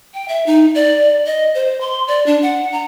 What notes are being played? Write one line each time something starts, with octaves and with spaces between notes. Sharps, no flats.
G5
E5
D#4
D5
D#5
C5
C6
D5
D4
F#5
A#5